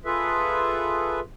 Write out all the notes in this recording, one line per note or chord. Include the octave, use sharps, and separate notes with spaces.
F4 G#4 A4 B4 E5